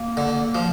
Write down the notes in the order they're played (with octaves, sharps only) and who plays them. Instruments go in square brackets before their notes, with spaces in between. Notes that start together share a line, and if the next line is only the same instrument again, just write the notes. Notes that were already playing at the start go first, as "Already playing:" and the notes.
Already playing: [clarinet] A#3
[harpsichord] D3
F3